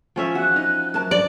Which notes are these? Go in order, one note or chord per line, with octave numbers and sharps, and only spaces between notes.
F3 C#4 E5
E2 F#4 F#6
D#4
F#2 A#4 A5
D5